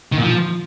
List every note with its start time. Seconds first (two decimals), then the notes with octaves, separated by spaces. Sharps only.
0.12 D#3
0.18 A#2
0.23 F3